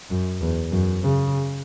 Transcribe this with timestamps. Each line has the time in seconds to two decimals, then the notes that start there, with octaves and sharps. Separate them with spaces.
0.10 F#2
0.41 E2
0.72 F#2
1.03 C#3